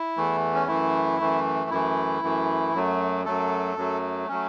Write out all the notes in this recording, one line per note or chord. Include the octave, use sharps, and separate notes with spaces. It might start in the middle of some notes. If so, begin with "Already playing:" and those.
Already playing: E4
E2 E3 A3
C#4
F#2 E3 A3 E4
F#2 E3 A3
F#2 E3 A3 E4
F#2 E3 A3
F#2 F#3 A3
F#2 F#3 A3 A4
F#2 F#3 A3
F#3 A3 C#4